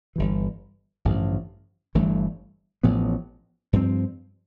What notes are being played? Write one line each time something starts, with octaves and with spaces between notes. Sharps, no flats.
G1 G2 E3
A1 G2 D3 F3
G1 G2 E3 A3
A1 A2 F3 B3
G2 F3 C4